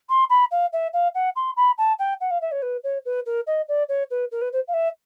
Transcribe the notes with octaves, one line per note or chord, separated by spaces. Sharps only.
C6
B5
F5
E5
F5
F#5
C6
B5
A5
G5
F#5
F5
E5
C#5
B4
C#5
B4
A#4
D#5
D5
C#5
B4
A#4
B4
C5
F5
E5